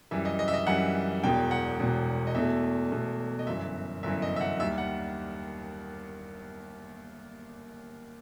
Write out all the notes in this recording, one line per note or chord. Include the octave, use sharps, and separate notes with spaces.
F#2 E3 G3 E5
D#5
D#5
E5
D#5
F#2 E3 G3 F#5
E1 E2 B2 G5
F#5
E1 E2 B2
D#5
E2 B2 A3 E5
E2 B2 A3
D#5
G1 F#2 E3 E5
G1 F#2 E3 E5
D#5
E5
F#5
D#2 D#3 G3 E5
F#5